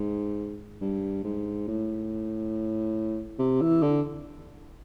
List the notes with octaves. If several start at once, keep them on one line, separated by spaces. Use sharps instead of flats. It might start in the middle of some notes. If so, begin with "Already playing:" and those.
Already playing: G#2
G2
G#2
A2
C3
E3
D3